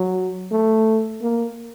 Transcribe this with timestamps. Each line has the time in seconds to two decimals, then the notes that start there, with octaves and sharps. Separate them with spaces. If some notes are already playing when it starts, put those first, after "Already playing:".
Already playing: F#3
0.52 A3
1.22 A#3